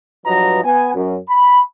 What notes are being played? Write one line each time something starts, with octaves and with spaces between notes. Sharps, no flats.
G2 F3 F#3 B4 D#5 A#5
B3 G#5
F#2
B5